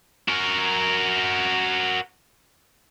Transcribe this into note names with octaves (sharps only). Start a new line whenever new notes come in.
F#4 A#4